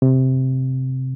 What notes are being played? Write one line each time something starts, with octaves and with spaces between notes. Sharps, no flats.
C3